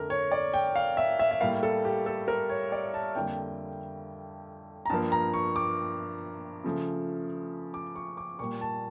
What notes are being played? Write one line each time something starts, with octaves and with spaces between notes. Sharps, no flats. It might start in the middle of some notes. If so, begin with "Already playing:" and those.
Already playing: F2 D3 A3 A#4
C#5
D5
G5
F5
E5
E5
E5
A2 G3 A#3 F5
A4
G4
A4
A#4
C#5
D5
A5
F2 D3 G3 A#3 G5
A#5
G2 F3 A#3 A5
A#5
C#6
D6
C#3 F3 A3
D6
C#6
D6
A#2 G3 A#3 C#6
A5